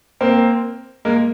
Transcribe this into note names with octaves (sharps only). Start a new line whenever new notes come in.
A#3 C4
G#3 A#3